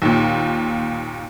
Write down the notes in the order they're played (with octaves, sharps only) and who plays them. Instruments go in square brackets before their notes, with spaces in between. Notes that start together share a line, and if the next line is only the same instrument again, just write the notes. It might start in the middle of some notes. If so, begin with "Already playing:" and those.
[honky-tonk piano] D#2 A#2